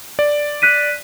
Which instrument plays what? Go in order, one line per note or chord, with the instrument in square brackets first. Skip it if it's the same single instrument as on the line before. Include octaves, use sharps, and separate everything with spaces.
[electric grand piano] D5
[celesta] F#6 B6 D#7